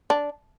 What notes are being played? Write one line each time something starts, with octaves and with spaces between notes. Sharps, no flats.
D4